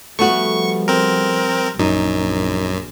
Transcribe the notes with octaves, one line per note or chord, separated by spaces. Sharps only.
F3 G3 A3 B3 F#4 C#6
C4 A#4
A#1 F#2 D#4